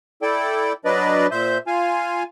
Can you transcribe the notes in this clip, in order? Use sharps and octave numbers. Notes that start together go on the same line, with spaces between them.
E4 A4 D5 G5
F#3 D4 B4 D5 D#5
A#2 C5 E5 G6
F4 F5 G#5